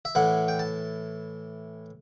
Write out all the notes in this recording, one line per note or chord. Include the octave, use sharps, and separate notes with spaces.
E5
A2 E3 F#5
G5
A5